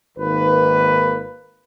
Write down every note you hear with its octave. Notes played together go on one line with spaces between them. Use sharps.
G#1 D#3 A#3 B4